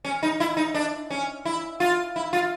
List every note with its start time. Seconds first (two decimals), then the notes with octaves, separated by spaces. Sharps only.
0.05 C#4
0.23 D#4
0.40 E4
0.57 D#4
0.74 D4
1.10 C#4
1.45 E4
1.80 F4
2.16 E4
2.33 F4